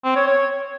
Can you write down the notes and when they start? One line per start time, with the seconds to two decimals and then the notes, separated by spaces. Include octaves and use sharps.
0.04 C4
0.16 C#5
0.27 C#5